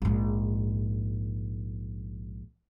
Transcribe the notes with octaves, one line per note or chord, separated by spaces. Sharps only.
A#1 G#2